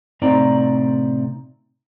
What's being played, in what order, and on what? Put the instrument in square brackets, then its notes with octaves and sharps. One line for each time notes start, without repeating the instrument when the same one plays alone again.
[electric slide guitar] A2 C3 C4 D#4 D5 A#5